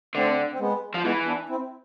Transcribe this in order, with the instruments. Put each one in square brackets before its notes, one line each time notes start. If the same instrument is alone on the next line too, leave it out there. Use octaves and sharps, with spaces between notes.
[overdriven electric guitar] D3 [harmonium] A3 C4
[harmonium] C4
G#3 B3
[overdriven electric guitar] F3
[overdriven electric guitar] E3 [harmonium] G#3 B3
[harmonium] B3 D4
C4 E4